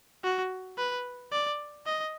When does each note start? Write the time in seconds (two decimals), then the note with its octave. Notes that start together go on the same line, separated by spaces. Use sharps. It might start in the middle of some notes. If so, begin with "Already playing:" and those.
0.24 F#4
0.78 B4
1.32 D5
1.86 D#5